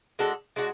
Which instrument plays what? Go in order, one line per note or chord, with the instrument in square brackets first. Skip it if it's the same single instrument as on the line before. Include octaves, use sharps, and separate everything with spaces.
[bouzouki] G#3 D4 F#4 A4
G#3 D4 F#4